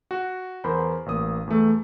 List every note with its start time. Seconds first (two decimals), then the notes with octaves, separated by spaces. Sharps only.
0.11 F#4
0.64 E2 A#4 C5 B5
1.06 A1 A#3 D#6
1.47 E2 A3